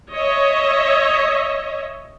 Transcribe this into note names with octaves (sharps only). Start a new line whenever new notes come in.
C#5 D#5 E5